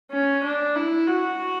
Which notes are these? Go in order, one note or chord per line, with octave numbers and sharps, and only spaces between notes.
C#4
D4
E4
F#4